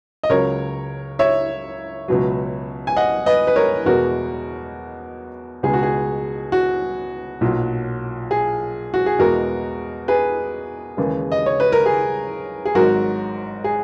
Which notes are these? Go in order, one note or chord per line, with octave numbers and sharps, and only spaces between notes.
D#5
C#2 C#3 F#3 A#4 C#5
C#5 E5
C#2 B2 F#3
G#5
D#5 F#5
B4 D#5
B4
A#4 C#5
E2 B2 G#3 F#4 A#4
C#2 B2 G#3 G#4
F#4
G#4
F#4
B1 A#2 F#3
G#4
F#4
G#4
E2 B2 G#3 F#4 A#4
G#4 B4
D#2 C#3 E3 G#3
D#5
C#5
B4
A#4
G#4
G#4
G#1 G#2 F#3 F#4 A#4
G#4